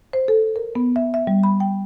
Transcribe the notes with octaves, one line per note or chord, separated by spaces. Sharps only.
C5
A4
A#4
B3
E5
E5
G3
B5
G5